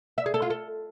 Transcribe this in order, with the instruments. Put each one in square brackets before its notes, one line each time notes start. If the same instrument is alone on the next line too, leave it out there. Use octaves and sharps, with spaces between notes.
[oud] E5
G#4
A4
F4
A4